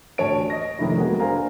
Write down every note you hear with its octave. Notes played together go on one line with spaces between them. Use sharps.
A1 D2 C#5 A5 D7
D#5 A#6
F2 C3 D#3 E3 A3 E4
G#3 A#3 B3 F#4 G#4 A#4
D4 A#4 C5 F5 G#5 A#5